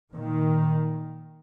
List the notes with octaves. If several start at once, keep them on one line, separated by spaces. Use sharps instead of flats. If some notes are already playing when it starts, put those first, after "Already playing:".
A#2 D#3